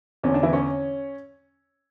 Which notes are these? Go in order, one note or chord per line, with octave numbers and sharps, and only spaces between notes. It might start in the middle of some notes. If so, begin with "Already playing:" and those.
E2 D3 C#4
D4
E3 E4
C#4 C#5